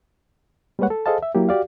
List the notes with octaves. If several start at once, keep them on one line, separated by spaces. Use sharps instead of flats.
G3 G#3 A#3 B4 C#5 F#5
A4
G#4 A4 C5 D#5 F5 A5
E5
F#3 A#3 E4 G4
F#4 G4 D5 F5